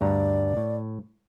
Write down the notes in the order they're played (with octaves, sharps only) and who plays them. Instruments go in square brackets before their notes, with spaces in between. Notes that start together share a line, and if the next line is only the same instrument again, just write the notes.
[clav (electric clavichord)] D2 G2 A#5 [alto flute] D5
[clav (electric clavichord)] A2